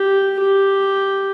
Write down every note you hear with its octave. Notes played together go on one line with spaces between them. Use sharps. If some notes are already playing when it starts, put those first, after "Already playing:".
Already playing: G4
G4